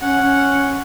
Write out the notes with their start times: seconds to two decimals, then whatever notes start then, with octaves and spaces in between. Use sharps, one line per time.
0.01 C#4 F#5
0.20 C#4